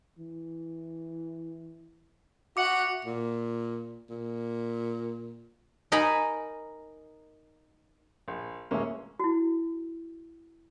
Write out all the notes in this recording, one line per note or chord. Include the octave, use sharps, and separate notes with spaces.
E3
F#4 E5 F#5 D6 C#7
A#2
A#2
D#4 A#4 D#5 G#5 B5
A#1
E1 G#3 A#3 C#4 E5
E4 F#4